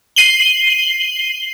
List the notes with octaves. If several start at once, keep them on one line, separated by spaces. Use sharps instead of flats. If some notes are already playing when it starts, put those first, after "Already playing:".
C7 D#7 F#7 G7